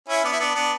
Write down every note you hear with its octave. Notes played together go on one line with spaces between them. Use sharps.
C#4 E4
B3 D4
E4
B3 D4
B3 D4